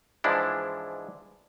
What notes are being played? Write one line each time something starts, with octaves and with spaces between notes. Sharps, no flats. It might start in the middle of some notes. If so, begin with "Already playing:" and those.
G#2 E3 F3 G#3 D4 E4